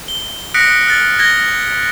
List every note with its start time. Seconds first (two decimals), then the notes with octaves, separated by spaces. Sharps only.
0.08 G7
0.54 D#6 F#6 A#6 B6 C#7 D7
0.87 F6 F#6 A6
1.19 G#6 A#6 G7